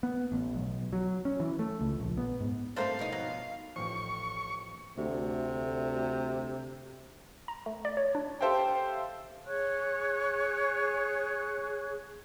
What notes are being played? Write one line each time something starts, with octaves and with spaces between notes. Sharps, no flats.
B3
A1
B1
F#3
C#4
E3
A3
C#2
A#1
B3
G#2
G2 A3 C4 D4 A#4 C5 F5
B2 F3 D#4
F#3
A1 F3 C#6
D2 C3
A#5
A3
D5
C#5
D4
G4 A4 C5 E5 F5 G5
G#4 C#5 C#6 F#6